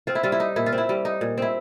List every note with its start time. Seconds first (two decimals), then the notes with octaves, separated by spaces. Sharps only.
0.07 C4 F4
0.15 E4
0.23 G3 F4
0.32 E4
0.40 D#4
0.56 A#2 E4
0.66 F4
0.72 C4
0.78 E4
0.89 G3
1.05 D#4
1.21 A#2
1.38 C4 E4